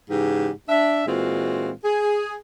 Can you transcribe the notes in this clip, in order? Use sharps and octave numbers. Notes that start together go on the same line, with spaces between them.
G#2 C#3 E3 G4
D4 E5
A#2 E3 G#3 C4 F4 F#4
G#4